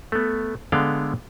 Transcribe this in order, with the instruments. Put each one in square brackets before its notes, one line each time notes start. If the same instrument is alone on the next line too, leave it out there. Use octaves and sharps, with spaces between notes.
[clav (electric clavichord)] A3 B3
D3 G#3 B3 D5 F5 G5